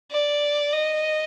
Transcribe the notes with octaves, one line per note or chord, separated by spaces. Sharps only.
D5
D#5